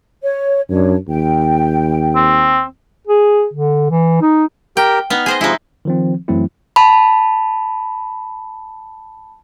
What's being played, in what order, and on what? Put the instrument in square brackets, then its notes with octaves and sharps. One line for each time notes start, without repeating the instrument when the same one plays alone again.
[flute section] C#5
[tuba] F#2 [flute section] D4 C#5
[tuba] D#2 [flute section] G5
[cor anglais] C4
[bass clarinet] G#4
D3
E3
D#4
[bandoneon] G4 A#4 [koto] G5
[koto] B3 D#4 [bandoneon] F6
[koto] G#4 C5 D#5
[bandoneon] C3 F3 G#3 [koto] D#4 E4
[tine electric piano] D#3 F3 C4
F#2 E3 F#3 A3 C4 E4
[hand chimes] A5 B5